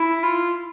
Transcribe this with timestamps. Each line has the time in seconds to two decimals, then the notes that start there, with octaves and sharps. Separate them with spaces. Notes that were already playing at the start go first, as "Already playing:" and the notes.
Already playing: E4
0.23 F4